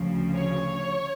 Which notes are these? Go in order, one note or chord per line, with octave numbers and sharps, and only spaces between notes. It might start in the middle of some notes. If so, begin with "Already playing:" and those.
Already playing: D2 C#3 F3
C#5